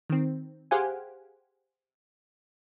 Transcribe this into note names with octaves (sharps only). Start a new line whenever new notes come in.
D#3 C4
G4 G#4 C5 F5 F#5 G#5